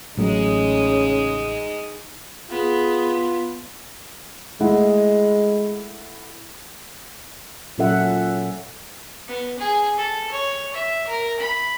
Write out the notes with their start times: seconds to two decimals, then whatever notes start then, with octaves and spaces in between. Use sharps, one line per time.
0.17 A1 C#3 F#3 G#3 A3 D#4
2.50 B3 F4 G#4
4.61 G#3 A3 E4 F#5
7.78 A#2 F#3 C#4 A4 E5 F#5
9.28 B3
9.59 G#4
9.98 A4
10.32 C#5
10.74 E5
11.07 A#4
11.40 B5